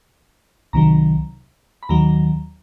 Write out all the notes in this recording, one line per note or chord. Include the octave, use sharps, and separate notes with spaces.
C2 C3 D#3 F#3 A#5
B5
D#2 D#3 F#3 A#5